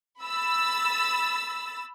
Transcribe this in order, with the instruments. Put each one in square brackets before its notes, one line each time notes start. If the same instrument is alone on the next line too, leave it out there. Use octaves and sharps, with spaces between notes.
[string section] B5 E6 A6